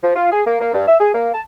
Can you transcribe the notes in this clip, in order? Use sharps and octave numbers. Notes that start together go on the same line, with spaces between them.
F3
F4
G#4
A#3
A#3
G2
E5
G#4
A#3
A5